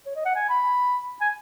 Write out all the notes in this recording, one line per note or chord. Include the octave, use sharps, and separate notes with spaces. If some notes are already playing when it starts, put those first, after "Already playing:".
C#5
D#5
F#5
G#5
B5
G#5